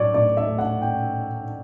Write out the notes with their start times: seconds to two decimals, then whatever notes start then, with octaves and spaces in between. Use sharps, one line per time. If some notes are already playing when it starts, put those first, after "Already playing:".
Already playing: A2 F#3 C#4 C#5 D5
0.14 A2 D5
0.37 E5
0.47 A3
0.59 F#5
0.82 C#4 G5